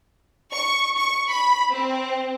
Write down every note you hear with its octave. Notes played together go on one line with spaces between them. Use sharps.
C#6
C#6
B5
C4